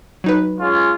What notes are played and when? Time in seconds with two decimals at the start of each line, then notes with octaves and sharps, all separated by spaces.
0.24 F#3 D#4 B4
0.59 G#3 C#4 F4